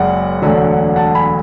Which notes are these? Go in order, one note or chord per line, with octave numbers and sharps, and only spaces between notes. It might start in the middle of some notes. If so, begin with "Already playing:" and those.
Already playing: F#1 F#2 C#3 G#3 D5 F#5
E1 D2 D3 F#3
F#5 A5
G#5 B5